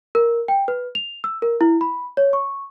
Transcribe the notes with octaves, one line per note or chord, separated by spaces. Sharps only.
A#4
G5
B4
F7
E6
A#4
E4
B5
C#5
C#6